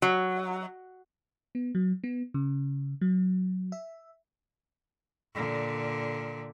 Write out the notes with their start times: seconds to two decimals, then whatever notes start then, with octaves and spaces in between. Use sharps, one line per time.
0.02 F#3
1.55 B3
1.75 F#3
2.04 B3
2.34 C#3
3.01 F#3
3.72 E5
5.34 A#2 D3